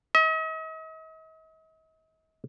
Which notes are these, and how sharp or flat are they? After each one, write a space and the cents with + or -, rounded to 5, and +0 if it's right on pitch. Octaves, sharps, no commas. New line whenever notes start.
D#5 +45